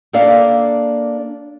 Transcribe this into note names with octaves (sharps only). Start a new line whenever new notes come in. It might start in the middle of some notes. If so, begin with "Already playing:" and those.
A#3 D4 A4 D5 F5